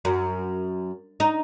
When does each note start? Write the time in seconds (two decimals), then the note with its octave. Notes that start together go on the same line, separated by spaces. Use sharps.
0.05 F#2
1.20 D#4